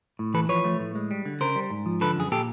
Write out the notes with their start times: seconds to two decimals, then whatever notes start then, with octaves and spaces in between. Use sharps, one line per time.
0.19 A2
0.34 E3 A4 B4
0.49 F3 B4 C#5
0.65 A3
0.79 A2
0.95 G#3
1.11 G3
1.25 D3
1.41 C#3 A#4 C5
1.55 G3
1.71 G#2
1.86 F3
2.01 D3 A4 B4
2.17 F#2 G#4
2.32 A#2 G4 A4